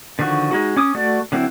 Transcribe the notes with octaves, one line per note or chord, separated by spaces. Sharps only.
D3 D#3 F3 F#4 C#6
G#3 D#4 F#4
C#4 D6 D#6
A3 F#4 D5
D3 F#3 C4 E4